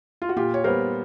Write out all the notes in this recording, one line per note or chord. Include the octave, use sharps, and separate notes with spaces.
F4
F#4
A#2 F4 G4
C#5
G3 B3 A#4 C5